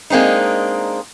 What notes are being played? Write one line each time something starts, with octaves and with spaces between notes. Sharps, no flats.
G#3 A#3 C4 D4 D#4